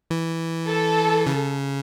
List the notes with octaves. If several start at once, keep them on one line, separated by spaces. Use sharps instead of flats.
E3
A4
C#3